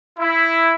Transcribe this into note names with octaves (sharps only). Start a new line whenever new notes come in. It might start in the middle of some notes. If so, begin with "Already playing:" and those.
E4